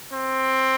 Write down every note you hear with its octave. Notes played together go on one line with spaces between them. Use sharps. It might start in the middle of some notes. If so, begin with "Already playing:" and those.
C4